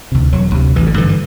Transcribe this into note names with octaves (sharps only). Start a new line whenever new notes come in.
D2 C3
E1 F#3
D2 C3
A1 E3
D3
G2 D3 E3
E3